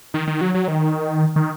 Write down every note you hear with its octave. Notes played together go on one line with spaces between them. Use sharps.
D#3
D#3
F#3
F#3
D#3
D#3